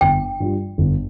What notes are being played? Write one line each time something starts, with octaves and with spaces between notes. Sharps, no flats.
G1 G5
G2 G3 F4
G1